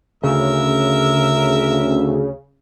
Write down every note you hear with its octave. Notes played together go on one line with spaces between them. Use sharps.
D2 C#3 A#4 E5 E6